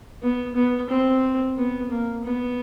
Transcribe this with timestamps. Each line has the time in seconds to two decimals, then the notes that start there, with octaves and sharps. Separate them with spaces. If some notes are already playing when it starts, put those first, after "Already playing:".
0.22 B3
0.56 B3
0.90 C4
1.57 B3
1.91 A#3
2.24 B3